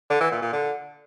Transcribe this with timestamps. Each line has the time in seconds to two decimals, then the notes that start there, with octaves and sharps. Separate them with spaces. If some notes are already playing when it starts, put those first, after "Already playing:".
0.10 D3
0.21 E3
0.32 A#2
0.42 A#2
0.53 D3